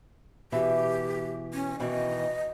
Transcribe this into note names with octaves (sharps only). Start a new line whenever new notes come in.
B2 E3 G4 E5
C#4
B2 D#3 E3 D#5